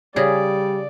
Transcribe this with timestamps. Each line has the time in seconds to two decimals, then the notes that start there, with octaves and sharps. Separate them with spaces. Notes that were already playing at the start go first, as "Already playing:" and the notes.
0.16 C#3 G3 G#4 D5